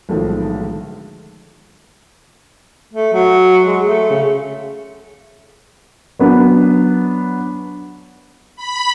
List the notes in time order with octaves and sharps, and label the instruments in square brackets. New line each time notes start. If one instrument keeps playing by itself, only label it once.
[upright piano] B1 A2 D3 D#3 F3 G#3
[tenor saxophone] A3
F#3
G#3
A3
C#3
[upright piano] F#3 B3 D4
[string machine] B5